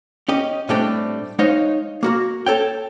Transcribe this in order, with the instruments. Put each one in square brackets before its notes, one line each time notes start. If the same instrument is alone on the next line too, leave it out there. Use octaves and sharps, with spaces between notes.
[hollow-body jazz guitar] C#4 G4 D#5
A2 G3 A3 C4 D4 G4
G#3 D#4 C5 C#5 D#5 F5
A#3 F#4 A#4
A4 C#5 G5